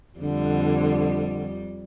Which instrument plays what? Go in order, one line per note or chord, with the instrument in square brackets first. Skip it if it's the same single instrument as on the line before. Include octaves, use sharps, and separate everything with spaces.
[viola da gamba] F2 G3 [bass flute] D3